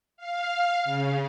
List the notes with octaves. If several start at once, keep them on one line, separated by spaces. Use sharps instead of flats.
F5
C#3